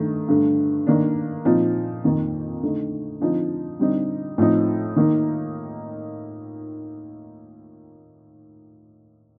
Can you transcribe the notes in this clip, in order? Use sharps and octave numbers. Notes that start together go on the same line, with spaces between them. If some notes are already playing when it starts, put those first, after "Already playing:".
Already playing: G2 D#3 A3
G2 D3 A3
D#3 A#3 D4
A#2 F3 C4 D#4
F2 D#3 A#3
D3 A3 D#4
D3 F3 C4 D#4
D3 G3 C4 D#4
A2 F3 C4 D#4
D#3 A#3 D#4